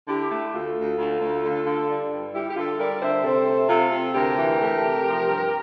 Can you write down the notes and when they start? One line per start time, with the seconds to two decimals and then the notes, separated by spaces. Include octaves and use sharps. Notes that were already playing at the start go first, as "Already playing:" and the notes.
0.08 D3 E4 G4
0.32 A3
0.53 D2 F4 A4
0.77 D2
0.99 D2
1.21 D2
1.44 D3
1.67 D3
1.89 G3
2.11 G2
2.34 G3 E4 G4
2.50 G4
2.56 D3 F4 A4
2.79 G3 A#4 D5
3.01 D3 C5 E5
3.24 C3 A4 C5
3.47 A3
3.69 C3 F4 A4
3.91 C3
4.14 D2 G4 A#4
4.37 E3
4.60 A3
4.83 C3
5.05 F3
5.28 G2